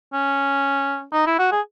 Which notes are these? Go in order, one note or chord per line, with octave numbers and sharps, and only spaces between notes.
C#4
D#4
E4
F#4
G#4